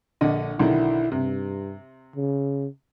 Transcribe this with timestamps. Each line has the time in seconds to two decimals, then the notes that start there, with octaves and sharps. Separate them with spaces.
0.21 A#1 D3 D#5
0.59 B1 D3 D#3 E4
1.12 G2 C3
2.16 C#3